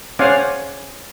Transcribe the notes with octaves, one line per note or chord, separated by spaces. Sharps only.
C#4 C5 D5 F5 F#5 G#5